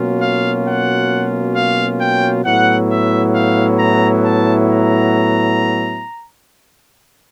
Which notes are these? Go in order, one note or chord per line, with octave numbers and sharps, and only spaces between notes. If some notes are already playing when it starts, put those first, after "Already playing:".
Already playing: B2 F#3 A#3 C#4 F4
F5
F#5
F5
G5
A2 F#3 B3 E4 F#5
E5
F5
A#5
A5
A#5